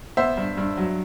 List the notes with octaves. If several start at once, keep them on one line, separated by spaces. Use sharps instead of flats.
B3 C5 E5
G2
G2
F#3